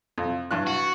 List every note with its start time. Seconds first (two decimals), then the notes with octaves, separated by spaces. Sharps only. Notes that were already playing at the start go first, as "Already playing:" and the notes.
0.18 F2
0.51 G2 E3 F#6
0.67 F#4